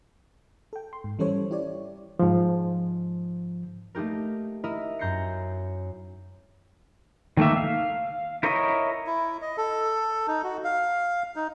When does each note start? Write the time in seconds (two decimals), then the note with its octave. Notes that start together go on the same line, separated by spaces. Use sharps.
0.73 A4 G5
0.93 C6
1.04 G#2
1.19 E3 G3 C#4 A4 C5 C#5
1.51 E4 G4 C#5 D5
2.19 G#2 F3
3.95 A3 A#3 D#4 G4 A#4
4.64 E4 A#4 D#5 E5
4.99 F#2 A#5 G6 A#6 C7 C#7
7.37 D#3 A3 A#3 E5
7.57 F5
8.43 E4 A#4 C#5 D#5
9.06 E4
9.42 D#5
9.58 A4
10.28 D#4
10.44 F#4
10.64 F5
11.36 D#4